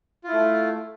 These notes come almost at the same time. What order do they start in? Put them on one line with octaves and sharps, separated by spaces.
F4 E4 A3